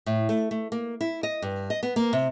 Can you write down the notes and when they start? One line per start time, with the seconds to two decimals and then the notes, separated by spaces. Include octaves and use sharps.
0.06 A2
0.29 A3
0.51 A3
0.72 A#3
1.01 E4
1.23 D#5
1.42 G2
1.70 D#5
1.83 B3
1.96 A#3
2.13 C3